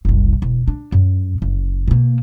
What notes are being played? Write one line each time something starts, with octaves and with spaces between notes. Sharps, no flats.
F#1 C2
E1
D4
F#2
F#1
B2 A#3